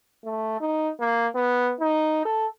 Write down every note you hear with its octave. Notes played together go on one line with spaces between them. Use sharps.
A3
D#4
A#3
B3
D#4
A4